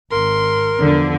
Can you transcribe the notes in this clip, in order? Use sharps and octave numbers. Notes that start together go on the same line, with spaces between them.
G#1 A#4 C6
E2 G2 D3 F3